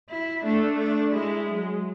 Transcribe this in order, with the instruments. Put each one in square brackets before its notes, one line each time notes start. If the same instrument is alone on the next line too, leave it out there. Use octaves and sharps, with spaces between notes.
[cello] E4
[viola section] A3 [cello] D4
[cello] D4
[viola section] G#3 [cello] E4
[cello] F#3